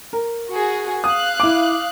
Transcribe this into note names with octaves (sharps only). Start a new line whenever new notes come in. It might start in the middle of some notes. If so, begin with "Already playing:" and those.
A#4
F#4 G#4
F5 D#6 F#6
E4 D6